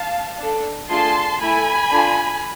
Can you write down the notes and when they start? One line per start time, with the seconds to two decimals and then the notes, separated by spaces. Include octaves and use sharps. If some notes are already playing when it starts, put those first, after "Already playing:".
Already playing: F5 A5
0.39 D4 A4
0.89 A3 D4 F4 G#4 A5 C6
1.40 A3 E4 A4 G#5 B5
1.91 D4 F4 A4